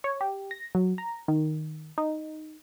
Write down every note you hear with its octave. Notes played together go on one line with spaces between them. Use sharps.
C#5
G4
A#6
F#3
A#5
D#3
D#4